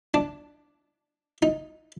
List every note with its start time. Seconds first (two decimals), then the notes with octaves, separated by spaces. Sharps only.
0.14 D4
1.42 D#4